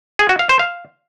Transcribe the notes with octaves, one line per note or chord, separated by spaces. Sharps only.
G#4
F#4
F5
C5
F5